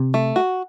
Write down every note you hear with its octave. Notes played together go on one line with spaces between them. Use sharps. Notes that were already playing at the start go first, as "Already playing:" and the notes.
Already playing: C3
A3
F#4